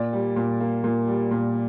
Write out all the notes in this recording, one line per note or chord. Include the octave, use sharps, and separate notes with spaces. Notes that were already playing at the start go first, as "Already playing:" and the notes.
Already playing: A#2 D5
G3
A#2
A#3
A#2
G3
A#2